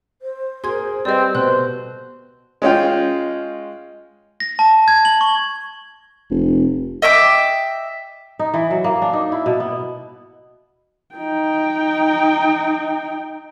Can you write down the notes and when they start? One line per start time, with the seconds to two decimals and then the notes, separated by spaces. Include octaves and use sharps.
0.22 C5
0.64 G#4 A#4 C6 G#6
1.05 G3 C4 B4 D5 D#5
1.35 B2 A4 C5 F#6
2.62 G#3 C#4 F4 G5
4.40 A#6
4.59 A5
4.88 G#6
5.05 F#7
5.21 C#6
6.30 F1
7.02 D#5 E5 G5 D6
8.39 D#4
8.54 E3
8.71 F#3
8.84 A#3
9.02 D4
9.13 D#4
9.32 E4
9.46 B2
9.60 B3
11.15 D#4 G5